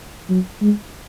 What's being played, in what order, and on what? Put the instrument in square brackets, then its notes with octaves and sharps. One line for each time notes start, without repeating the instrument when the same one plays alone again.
[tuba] F#3
G#3